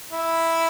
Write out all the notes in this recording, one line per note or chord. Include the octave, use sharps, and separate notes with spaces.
E4